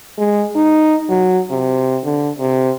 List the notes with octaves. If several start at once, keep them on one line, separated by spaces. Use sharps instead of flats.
G#3
D#4
F#3
C3
D3
C3